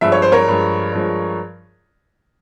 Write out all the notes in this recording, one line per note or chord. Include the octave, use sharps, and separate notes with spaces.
G2 F3 G#3 E5
C#5
C5
A#4 C#5
G2 F3 G#3
G2 F3 G#3